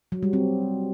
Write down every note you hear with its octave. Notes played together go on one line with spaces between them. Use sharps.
F#3
G3
C4